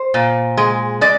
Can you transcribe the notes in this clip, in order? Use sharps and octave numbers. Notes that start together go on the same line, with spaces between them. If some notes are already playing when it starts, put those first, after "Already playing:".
Already playing: C5
A#2
G#3
G#3 D5